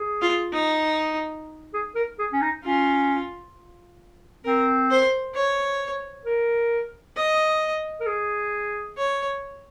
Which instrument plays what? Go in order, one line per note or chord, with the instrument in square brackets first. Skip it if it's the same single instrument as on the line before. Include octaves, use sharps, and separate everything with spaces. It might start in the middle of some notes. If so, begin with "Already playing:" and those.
Already playing: [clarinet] G#4
[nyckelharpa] F4
D#4
[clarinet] G#4
A#4
G#4
C#4
D#4
[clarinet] C#4 [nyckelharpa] F4
[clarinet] C4 [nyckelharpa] A#4
[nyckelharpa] C5
C#5
[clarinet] A#4
[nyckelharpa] D#5
[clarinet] A#4
G#4
[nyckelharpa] C#5